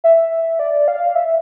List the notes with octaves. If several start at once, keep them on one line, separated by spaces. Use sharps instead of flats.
E5
D5
F5
E5